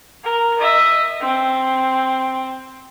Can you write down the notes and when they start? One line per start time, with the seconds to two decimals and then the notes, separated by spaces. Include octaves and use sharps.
0.24 A#4
0.59 D#5 E5
1.21 C4